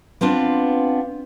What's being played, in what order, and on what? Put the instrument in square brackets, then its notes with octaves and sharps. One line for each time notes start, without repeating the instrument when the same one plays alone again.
[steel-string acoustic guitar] B3 C4 D4 F4